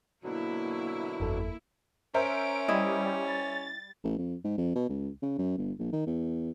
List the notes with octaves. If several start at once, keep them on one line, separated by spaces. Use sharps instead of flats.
B2 D3 F#3 A#3 E4
G1 F2 A4
C#4 A#4 C5 E5 D7
G3 E4 D#5
A6
A1
F2
G#2
F2
B2
C#2
C#3
F#2
G1
A#1
D#3
E2